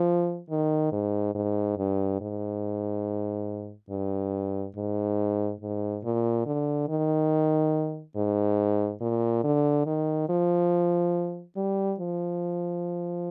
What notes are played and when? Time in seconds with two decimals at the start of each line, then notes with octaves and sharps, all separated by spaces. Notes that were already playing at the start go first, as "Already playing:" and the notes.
Already playing: F3
0.50 D#3
0.92 G#2
1.35 G#2
1.78 G2
2.21 G#2
3.90 G2
4.76 G#2
5.61 G#2
6.04 A#2
6.46 D3
6.88 D#3
8.16 G#2
9.01 A#2
9.44 D3
9.86 D#3
10.29 F3
11.56 G3
11.99 F3